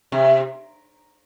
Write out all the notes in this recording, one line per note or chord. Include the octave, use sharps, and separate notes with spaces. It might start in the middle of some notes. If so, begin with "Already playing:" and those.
C3